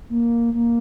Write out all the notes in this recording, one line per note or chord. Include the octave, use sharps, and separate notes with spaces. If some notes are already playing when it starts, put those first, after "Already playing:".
A#3
A#3